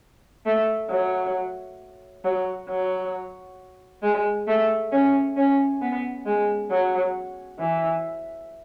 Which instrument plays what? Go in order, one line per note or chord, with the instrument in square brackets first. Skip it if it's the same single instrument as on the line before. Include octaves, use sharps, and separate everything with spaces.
[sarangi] A3
F#3
F#3
F#3
G#3
A3
C#4
C#4
B3
G#3
F#3
E3